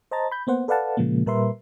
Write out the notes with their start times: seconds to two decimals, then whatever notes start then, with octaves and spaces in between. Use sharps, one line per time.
0.11 C5 D#5 A5 A#5 A6
0.31 B5 G6
0.47 A#3 B3 C5 F#5
0.68 A4 B4 D5 F5 F#5 A5
0.97 A#2 C#3 F3 G#3 A#3
1.26 A#2 G3 A#4 B4 E5 C6